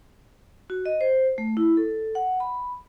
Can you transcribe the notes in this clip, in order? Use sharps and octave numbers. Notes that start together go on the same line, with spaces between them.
F#4
D#5
C5
A3
E4
A4
F#5
B5